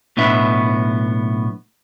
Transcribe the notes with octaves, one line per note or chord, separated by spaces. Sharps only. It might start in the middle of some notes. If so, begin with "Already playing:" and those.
B1 A2 B3 D4 E5